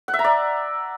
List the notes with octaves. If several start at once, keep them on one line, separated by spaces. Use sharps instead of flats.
F#5
E5
A#5
D5